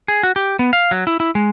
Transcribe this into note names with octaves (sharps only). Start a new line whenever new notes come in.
G#4
F#4
G4
B3
F5
F#3
E4
E4
G#3